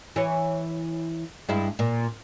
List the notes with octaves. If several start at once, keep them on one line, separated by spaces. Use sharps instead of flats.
E3 C#5
G2 G#3 E4
A#2